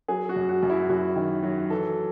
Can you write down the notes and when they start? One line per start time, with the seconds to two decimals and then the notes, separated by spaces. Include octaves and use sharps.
0.08 F#3 G#4
0.29 F#4
0.36 F#2
0.49 F#4
0.63 F#2
0.70 E4
0.89 F#2 F#4
1.16 D#3
1.43 F#3
1.70 E3 A4